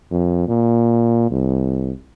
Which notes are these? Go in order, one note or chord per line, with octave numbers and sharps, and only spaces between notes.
F2
A#2
C2